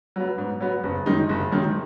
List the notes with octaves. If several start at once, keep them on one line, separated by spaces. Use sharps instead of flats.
F#3 B3
G#2
F#3 B3
F#1
F#2 D#3 G#3 D#4
F#1
F#2 D#3 G#3 D#4